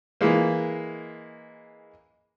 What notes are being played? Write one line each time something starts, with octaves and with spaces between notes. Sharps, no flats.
E3 G#3 A#3